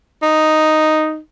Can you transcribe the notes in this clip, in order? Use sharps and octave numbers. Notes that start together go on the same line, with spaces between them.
D#4